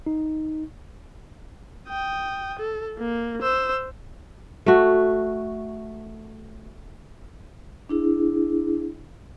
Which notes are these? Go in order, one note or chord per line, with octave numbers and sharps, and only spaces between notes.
D#4
G5 D#6
A4
A#3
C5 E6
A3 F#4
D4 E4 G#4